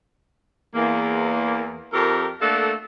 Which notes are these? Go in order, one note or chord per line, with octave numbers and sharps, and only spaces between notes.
E2 A#3
F2 G4 A4 A#4
A3 A#3 D4 A4 F5 F#5